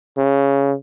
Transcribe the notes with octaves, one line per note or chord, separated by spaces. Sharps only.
C#3